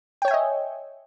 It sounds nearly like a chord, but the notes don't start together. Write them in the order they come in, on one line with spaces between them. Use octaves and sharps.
G5 C#5 G#5 E5 D#5